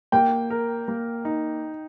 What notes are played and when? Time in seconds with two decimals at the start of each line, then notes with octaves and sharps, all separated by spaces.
0.12 A#3 G5
0.50 A#4
0.88 A#3
1.25 D#4